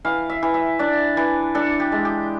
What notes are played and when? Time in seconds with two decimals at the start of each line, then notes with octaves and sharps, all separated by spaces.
0.05 E3 F5
0.29 E5
0.43 E3
0.54 E5
0.79 D4 D5
1.17 E3
1.55 D4 A4
1.80 G4
1.92 G#3
2.05 G4